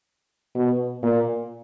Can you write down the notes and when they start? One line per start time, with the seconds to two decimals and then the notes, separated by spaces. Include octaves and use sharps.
0.55 B2
1.03 A#2